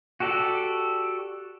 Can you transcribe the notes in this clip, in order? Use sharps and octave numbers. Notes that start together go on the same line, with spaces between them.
F#4 G4 A4 D5